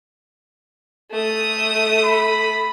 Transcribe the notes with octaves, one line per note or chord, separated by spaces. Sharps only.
A3 D#6
B5